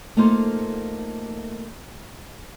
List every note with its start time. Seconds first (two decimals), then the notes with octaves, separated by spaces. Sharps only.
0.17 A3 A#3 D#4 F4 A4 C5